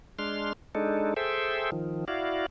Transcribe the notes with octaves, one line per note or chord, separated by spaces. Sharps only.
G#3 D4 C6 F6
G#3 D4 D#4 A4
G#4 A4 C5 E5 G5
D#3 F3
E4 F#4 D5 F5